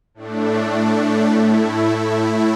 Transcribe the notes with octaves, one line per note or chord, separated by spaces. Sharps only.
A2 A3 D4
A2 A3 E4